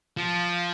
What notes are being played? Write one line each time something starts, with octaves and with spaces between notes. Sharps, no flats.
F3